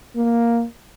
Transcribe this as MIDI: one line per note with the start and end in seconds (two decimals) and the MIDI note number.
0.16 0.64 58